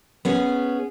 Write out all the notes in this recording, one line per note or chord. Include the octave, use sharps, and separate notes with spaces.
B3 C#4 G#4